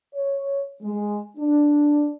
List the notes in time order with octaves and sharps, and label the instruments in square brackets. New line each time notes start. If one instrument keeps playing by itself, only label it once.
[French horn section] C#5
G#3
D4